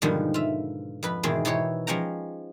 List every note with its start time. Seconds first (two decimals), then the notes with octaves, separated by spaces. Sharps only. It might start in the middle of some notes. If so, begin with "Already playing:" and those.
0.02 G#2 B2 D3 D#3 F3 G3
0.34 F4 E5
1.03 F2 B4 B5
1.23 E2 G#2 B2 D#3 G#3 C4
1.45 B2 E3 D#4 G4 C5 C#5
1.87 F3 G#3 C#4 G5 A#5